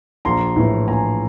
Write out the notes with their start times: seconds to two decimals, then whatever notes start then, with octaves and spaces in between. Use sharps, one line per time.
0.25 A#1 A#5 C6
0.56 A2 E3
0.87 A#1 G#5 A#5